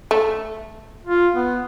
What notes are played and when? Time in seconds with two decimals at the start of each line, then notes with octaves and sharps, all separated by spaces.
0.11 A3
1.05 F4
1.34 B3